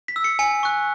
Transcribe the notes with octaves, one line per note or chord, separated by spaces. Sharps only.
B6
E6
C#7
G#5 C#7
C#6 F#6